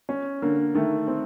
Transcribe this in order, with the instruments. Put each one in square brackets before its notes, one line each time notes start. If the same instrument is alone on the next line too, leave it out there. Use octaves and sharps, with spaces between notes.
[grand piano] C#4
[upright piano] D3 [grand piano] A#3
[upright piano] D#3 [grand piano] A3
[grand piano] C4